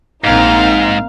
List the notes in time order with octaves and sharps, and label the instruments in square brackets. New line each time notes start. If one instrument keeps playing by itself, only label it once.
[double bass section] A#1 A#3 C4 [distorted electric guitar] G#2 [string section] D#4 [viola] F5